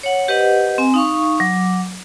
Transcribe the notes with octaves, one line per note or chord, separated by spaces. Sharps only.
C#5 F#5
G4 B4 C5 D#5 F#5
C4 G#5
D#4 F5 C#6
F#3 D6